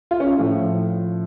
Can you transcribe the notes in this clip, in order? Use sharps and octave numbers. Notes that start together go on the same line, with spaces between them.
F4
C#4
A2 F3